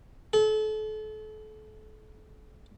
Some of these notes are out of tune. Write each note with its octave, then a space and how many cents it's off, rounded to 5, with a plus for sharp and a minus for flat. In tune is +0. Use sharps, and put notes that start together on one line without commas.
A4 -35